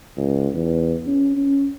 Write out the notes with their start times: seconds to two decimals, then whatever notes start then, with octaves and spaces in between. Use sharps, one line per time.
0.17 C#2
0.54 E2
1.06 C#4
1.37 C#4